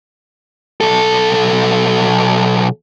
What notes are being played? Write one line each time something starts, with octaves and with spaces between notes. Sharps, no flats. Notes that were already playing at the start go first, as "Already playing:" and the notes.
B1 A4